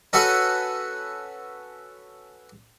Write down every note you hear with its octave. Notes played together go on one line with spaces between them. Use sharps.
C#4 F#4 A4 B4 F#5 G#5